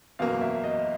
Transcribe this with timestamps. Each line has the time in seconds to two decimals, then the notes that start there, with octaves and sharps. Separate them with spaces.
0.19 F#1 E2 B2 F#3 A#3 F5
0.41 E5
0.64 D#5